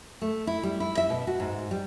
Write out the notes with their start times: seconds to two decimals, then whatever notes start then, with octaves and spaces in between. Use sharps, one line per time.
0.21 A3
0.47 E4
0.63 G3
0.80 E4
0.97 E5
1.10 B2
1.27 F#4
1.40 G#2
1.71 G3